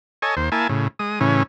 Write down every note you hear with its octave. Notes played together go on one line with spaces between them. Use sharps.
A4 C#5 D#5 G#5
D#2 C5
A#3 E4 G#5 A5
A2 C#3
G#3 D#6
A2 C#3 E3 C#4